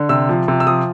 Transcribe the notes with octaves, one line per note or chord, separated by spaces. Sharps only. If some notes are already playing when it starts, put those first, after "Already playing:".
Already playing: D3
C3 E6
F3
C3
E6
F3 D#6